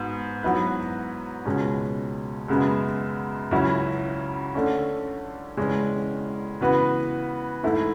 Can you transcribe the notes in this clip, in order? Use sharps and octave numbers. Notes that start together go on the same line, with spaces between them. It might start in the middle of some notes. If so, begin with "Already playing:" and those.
Already playing: G#2 B3 F#4
G#2 F#3 B3 E4 B4
C#2 B2 G#3 C#4
F#2 C#3 G#3 B3
C#2 C#3 F#3 C#4 E4
D3 A3 C#4
E1 E2 C#3 G#3 C#4
C#3 E3 B3 F#4 B4
G#2 E3 A3 E4